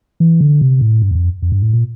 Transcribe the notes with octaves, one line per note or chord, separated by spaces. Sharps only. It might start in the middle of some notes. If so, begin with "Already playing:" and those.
E3
D3
C3
A2
G2
E2
F2
F2
G2
A2
A#2